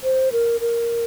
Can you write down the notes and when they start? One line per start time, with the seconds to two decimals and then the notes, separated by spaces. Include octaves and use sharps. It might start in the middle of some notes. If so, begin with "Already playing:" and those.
0.03 C5
0.32 A#4
0.61 A#4